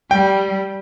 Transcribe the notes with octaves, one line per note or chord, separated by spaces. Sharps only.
G3 G5